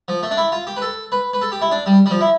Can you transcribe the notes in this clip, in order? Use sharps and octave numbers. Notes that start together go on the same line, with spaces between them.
F3
A3
D4
E4
F4
G4
B4
A4
B4
B4
A4
G4
E4
D4
G3
G3
F3
E4